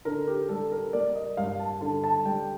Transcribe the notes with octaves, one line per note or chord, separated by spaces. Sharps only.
D3 A#4
G4
G3 A4
A#4
A#3 D5
D#5
G2 F5
A5
D3 A5
A5
G3 G5